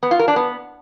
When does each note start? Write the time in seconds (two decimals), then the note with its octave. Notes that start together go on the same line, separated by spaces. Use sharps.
0.03 B3
0.11 F4
0.19 A#4
0.28 D4
0.36 B3